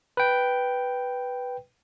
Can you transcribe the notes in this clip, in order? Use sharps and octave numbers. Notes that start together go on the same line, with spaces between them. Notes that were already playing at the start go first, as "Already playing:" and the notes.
B4 G5